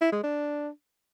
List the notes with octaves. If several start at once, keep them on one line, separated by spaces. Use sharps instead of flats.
E4
G#3
D4